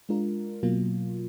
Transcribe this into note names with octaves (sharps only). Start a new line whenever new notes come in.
G#3 D4 F4 A#4
B2 F#3 A#3 F4